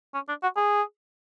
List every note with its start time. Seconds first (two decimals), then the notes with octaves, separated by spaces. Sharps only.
0.14 C#4
0.28 D4
0.42 F#4
0.56 G#4